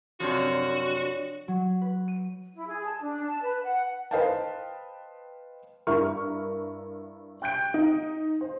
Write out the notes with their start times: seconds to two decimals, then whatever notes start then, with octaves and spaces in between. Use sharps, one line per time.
0.20 F#2 C3 F3 D4 F#4 C#5 D5
1.48 F#3
1.82 B4
2.08 D#7
2.54 E4
2.67 G#4
2.85 A5
3.00 D4
3.23 A5
3.42 B4
3.63 F#5
4.11 B4 C5 D#5 F5 G5 A5
5.87 G2 E4 A#4 C#6 F6
7.42 G5 F#6 G6 D7
7.74 D#4
8.41 C5